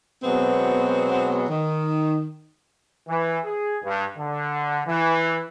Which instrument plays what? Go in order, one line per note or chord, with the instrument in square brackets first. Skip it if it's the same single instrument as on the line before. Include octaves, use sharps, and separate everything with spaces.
[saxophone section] B2 F#3 G#3 B3 C4
D#3
[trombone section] E3
G#4
G2
D3
E3